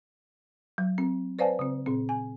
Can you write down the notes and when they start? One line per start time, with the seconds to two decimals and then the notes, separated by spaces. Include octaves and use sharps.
0.78 F#3
0.98 C4
1.39 B4 C5 D5 F5 G#5 A5
1.59 C#3 C4
1.86 A#2 C4
2.09 G#5